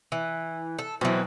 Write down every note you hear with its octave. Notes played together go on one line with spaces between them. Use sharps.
E3
A4
B2 E3 F#3 C4